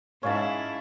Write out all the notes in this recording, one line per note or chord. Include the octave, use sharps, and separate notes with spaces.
G#2 C#4 E4 F5 A5